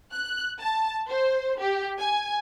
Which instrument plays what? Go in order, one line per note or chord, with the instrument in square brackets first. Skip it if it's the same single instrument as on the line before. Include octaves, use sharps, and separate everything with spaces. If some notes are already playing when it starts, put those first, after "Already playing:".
[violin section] F#6
A5
C5
G4
G#5